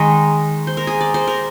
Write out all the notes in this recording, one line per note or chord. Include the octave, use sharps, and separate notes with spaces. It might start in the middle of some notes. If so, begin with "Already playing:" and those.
Already playing: D#3 G#3 A#4
C5
A#4
G#4
D5
C5
A#4